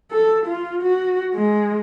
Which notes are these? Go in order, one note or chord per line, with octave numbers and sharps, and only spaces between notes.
A4
F4
F#4
G#3